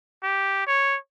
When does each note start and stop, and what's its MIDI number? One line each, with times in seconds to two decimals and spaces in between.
0.23 0.65 67
0.67 0.96 73